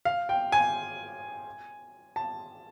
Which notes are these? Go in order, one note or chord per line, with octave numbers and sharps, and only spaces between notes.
F5
G5
G#5
A5